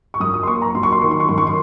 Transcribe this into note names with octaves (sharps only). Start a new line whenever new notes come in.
C#6
F#2 D#6
D#6
C6
A#3 C#6
A#5
F#3 C6
C#6
C6
D#3 C#6
C6
C#6
F#2 C6
C#6
C6